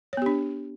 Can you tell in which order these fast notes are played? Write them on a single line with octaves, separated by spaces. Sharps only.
C#5 B3 G4 D4